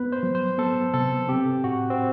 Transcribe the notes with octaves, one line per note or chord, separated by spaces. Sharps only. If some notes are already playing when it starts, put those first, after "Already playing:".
Already playing: B3 B4
C5
F#3
C5
B3 A4
C3 A4
C4 G4
A2 F#4
C4